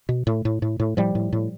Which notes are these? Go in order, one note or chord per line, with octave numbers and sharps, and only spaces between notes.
B2
A2
A2
A2
A2
A2 F3 G3
A2
A2